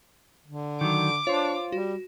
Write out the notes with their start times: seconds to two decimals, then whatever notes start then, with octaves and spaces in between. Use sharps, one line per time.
0.46 D3
0.81 D#3 F#3 D6
1.27 D4 F4 C5 C#5
1.72 G3 F#4